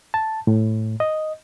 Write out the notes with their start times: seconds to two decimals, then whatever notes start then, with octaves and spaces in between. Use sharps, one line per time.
0.14 A5
0.47 A2
1.00 D#5